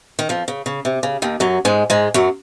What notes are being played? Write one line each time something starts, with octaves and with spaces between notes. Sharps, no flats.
D#3
F2 F3
C#3
C#3
C3
C#3
D#2 D#3
F#2 F#3
G#2 G#3
G#2 G#3
F#2 F#3